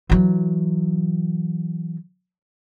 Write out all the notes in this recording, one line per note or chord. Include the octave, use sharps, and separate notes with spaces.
E3 F#3